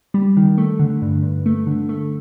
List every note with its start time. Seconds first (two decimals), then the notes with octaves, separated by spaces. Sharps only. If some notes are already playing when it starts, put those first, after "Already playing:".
0.14 G3
0.37 D#3
0.58 A3
0.79 D3
1.02 G2
1.23 G2
1.46 A3
1.67 D3
1.89 A3